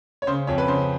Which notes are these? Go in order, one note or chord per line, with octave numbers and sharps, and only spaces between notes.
C#5
C#3 C5
F2 C#5
B4
C#3 C5